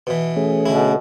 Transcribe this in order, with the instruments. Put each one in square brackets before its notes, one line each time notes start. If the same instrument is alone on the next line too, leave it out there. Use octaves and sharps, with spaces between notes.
[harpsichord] B2 E3
[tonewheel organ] A3 C#4 G#4
[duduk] B2 [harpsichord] D3 E4